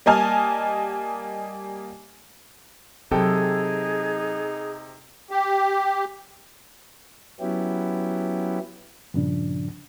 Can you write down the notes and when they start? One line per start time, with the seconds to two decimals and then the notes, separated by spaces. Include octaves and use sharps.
0.06 G3 A#3 D#5 G#5 A5 F6
3.11 C3 F#3 D#4 G#4 A4 G5
5.31 G4
7.40 F#3 B3 C#4 E4 G4
9.14 G2 A#2 C#3 F3 D4